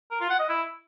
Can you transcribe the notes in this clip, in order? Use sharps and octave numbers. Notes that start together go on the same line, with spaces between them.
A#4
F4
F#5
D#5
E4